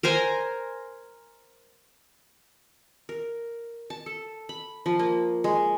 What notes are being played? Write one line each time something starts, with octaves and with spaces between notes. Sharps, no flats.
A#4 C5 G#5 A#5
A#4
A5
A4
B5
F3
A#3
G#3